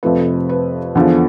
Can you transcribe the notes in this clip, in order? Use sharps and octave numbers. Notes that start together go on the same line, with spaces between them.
F2 C3 F3 A3 B4
B4
E2 D3 F3 B3